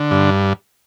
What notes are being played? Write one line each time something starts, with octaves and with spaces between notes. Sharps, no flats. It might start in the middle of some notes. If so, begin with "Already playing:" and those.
Already playing: D3
G2